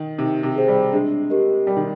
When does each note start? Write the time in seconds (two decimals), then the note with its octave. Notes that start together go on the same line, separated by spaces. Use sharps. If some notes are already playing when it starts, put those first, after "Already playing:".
Already playing: D#3
0.19 C3 D#4
0.43 C3
0.56 G#4 C5 G5
0.68 G3
0.92 G#3 D4
1.30 G4 A#4 D#5
1.67 G3 A#4
1.77 D#3